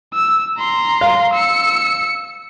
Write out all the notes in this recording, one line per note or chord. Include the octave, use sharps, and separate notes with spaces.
E6
A#5 C6
F5
E6 C#7